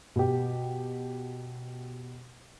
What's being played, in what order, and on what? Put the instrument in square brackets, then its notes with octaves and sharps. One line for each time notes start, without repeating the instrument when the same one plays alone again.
[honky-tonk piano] B2 G4